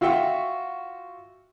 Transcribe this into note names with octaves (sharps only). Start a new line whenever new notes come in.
F4 F#4 E5 G5 C#6